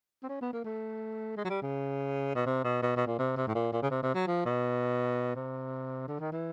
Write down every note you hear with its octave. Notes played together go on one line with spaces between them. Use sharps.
C4
C#4
B3
A#3
A3
G#3
F#3
G3
C#3
B2
C3
B2
B2
B2
A#2
C3
C3
A2
A#2
A#2
C#3
C3
C3
F#3
F3
B2
C3
D3
D#3
E3